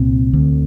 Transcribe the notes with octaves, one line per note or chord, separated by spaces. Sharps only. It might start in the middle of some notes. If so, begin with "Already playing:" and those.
Already playing: C2 A#2 C4
D2 D3